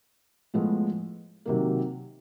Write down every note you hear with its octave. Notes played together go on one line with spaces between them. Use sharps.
A2 F3 G#3 B3
C3 D#3 F#3 A#3